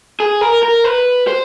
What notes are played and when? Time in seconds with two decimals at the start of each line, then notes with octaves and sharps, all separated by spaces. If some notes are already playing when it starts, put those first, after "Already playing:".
0.20 G#4
0.41 A#4
0.63 A#4
0.84 B4
1.27 C5